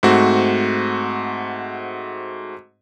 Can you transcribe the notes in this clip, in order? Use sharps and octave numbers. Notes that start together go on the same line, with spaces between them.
G#2 A3 C4 F#4